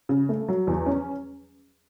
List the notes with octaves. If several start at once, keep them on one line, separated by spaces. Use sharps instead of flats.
C#3
A3
F#3
E2
C#4